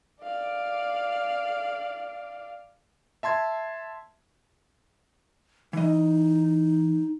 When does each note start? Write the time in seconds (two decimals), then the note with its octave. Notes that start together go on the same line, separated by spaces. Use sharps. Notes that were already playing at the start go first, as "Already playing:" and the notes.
0.23 D5 F5
3.23 E5 A5 C6 G#6
5.73 E3 D#4 D#5